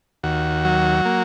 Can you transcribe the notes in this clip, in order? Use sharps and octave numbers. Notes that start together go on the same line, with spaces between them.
D#2 F#4
F#3
A#3